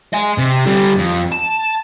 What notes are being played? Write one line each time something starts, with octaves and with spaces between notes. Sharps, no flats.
D#5 G#5
C3
D3 G3
F2
A5